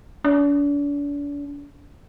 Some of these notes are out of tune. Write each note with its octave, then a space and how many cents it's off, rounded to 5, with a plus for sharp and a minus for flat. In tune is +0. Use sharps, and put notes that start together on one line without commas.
D4 -40